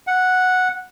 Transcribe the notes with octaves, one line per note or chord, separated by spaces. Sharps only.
F#5